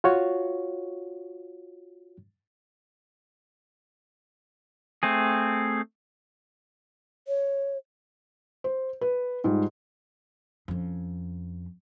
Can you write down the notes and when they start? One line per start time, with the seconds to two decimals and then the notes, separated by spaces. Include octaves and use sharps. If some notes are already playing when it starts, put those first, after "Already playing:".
0.04 F4 F#4 C#5
5.03 A3 C4 G#4
7.28 C#5
8.64 C5
9.01 B4
9.44 G#2 G3 F4 G4
10.68 F2 C#4